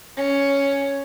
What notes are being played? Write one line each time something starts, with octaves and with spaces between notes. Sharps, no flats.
C#4